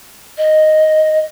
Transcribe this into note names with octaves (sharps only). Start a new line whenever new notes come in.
D#5